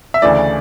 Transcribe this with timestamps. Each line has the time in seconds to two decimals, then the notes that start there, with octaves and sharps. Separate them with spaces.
0.14 E5
0.22 D2 C#3 E3 A3 D5